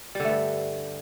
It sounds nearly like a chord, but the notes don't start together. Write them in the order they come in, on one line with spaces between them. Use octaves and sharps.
G3 D3 A3 G2